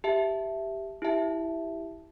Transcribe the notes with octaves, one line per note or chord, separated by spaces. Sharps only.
G4 E5 A5
E4 G4 E5 A5